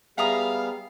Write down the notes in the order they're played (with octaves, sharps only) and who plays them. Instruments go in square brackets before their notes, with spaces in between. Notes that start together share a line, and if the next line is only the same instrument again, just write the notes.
[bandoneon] G3 B3 [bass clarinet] G#4 [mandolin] E5 A#5 D#6 [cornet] F5